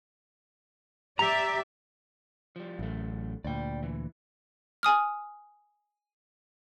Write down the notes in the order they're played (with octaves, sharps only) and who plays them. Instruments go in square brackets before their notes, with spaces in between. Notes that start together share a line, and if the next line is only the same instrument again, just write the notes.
[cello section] G4 D5 E5 [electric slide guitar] A#5
[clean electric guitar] F3 G3
[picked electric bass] A1 [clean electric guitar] F#2 A3
[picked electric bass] D2 A#2 [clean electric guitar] D5 G5
[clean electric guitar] E3
[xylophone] G#5 D#6 F6